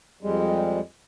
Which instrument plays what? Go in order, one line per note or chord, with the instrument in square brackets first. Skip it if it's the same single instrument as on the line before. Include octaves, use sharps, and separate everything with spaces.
[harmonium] F2 G3 G#3